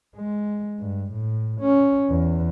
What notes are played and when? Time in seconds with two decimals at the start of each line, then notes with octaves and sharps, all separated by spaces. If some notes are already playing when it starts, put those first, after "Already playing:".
0.16 G#3
0.79 G2
1.12 A2
1.61 C#4
2.09 E2